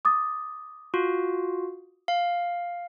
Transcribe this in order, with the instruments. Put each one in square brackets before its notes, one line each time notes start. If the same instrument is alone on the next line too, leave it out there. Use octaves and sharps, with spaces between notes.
[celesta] D6 D#6 A6
[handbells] F4 F#4
F5